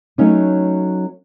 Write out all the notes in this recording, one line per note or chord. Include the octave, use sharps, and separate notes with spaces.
F#3 A3 C#4 D#4